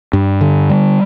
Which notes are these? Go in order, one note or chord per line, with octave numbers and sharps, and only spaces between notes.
G2
D3
G3